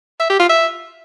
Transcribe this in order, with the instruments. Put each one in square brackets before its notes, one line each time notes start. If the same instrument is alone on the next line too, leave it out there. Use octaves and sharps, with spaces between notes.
[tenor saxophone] E5
G4
F4
E5